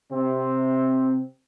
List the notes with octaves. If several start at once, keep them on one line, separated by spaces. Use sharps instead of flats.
C3 C4